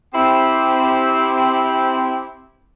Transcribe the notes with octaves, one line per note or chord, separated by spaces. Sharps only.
C4 E4 G4